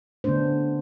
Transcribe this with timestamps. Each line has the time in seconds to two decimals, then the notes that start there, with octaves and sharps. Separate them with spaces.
0.24 D3 A3 B3 C#4 D4 C5